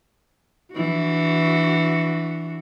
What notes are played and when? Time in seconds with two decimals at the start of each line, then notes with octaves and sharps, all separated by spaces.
0.74 E3 D4 F#4